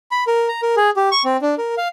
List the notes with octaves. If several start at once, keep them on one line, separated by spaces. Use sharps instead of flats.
B5
A#4
A#5
A#4
G#4
G4
C#6
C4
D4
A#4
F5